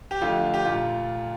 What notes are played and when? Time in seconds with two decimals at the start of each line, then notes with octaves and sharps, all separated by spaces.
0.11 G4
0.21 F2 D3 A3 F4
0.54 G4
0.65 A#2 A3 F4